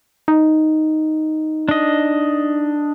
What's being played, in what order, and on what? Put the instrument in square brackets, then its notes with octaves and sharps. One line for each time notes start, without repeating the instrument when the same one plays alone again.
[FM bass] D#4
[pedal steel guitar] D4 D#5